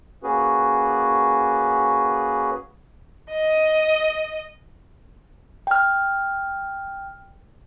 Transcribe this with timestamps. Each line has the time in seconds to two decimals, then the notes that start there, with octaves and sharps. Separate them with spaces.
0.24 A#3 C#4 F#4 G#4 B4
3.31 D#5
5.67 G5 F6